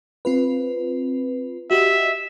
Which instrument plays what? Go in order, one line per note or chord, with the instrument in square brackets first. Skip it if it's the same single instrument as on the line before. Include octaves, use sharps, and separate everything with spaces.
[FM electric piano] C4 F4 B4
[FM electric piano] F#4 G4 D#5 [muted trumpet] E5